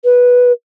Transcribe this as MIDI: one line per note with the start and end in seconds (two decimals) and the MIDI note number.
0.04 0.52 71